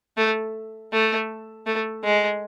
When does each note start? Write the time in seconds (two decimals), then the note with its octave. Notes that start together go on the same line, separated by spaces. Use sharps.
0.17 A3
0.93 A3
1.66 A3
2.04 G#3